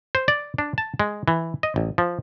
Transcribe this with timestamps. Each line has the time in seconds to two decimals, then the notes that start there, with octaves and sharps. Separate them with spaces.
0.15 C5
0.28 D5
0.58 D4
0.78 A5
1.00 G#3
1.28 E3
1.63 D#5
1.76 A1
1.98 F3